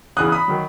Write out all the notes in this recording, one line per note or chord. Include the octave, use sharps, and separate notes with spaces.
E2 C#3 E3 D#6 F#6
B5 D#6
D#3 F#3